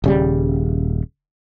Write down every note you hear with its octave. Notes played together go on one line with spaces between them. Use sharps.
D#1 C#3 G3